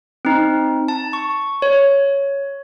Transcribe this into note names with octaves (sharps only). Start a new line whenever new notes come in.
C4 D#4
A5
C#6
C#5